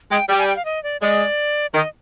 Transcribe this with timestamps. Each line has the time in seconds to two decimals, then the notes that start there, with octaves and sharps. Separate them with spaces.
0.11 G#3 G5
0.29 G3 G5
0.38 G#5
0.47 G5
0.56 F5
0.65 D#5
0.84 D5
1.01 G#3 D5
1.74 D#3 D#5